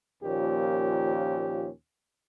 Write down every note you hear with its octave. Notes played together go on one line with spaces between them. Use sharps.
D#2 A#2 F3 C#4 G4